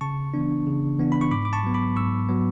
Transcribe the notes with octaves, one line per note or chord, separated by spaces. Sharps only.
C#3 A5 C#6
E3 B3 D4
C#3
E3 B3 D4
B5
C#6
G#2 B5 D6
D6
A5 C#6
F#3 B3
B5 D6
G#2 C#6 E6
F#3 B3